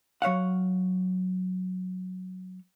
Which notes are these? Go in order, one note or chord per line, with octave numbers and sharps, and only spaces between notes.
F#3 C#5 F5 F#5